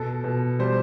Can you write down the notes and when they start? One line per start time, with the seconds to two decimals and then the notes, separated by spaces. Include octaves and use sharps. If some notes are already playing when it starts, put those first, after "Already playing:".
Already playing: B2 A4
0.24 B2
0.59 G3 C5